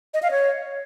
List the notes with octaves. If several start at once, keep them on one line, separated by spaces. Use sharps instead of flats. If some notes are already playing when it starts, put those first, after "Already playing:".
D#5
F5
C#5